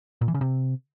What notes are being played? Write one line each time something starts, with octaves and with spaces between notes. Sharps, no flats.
A#2
E3
C#3
C3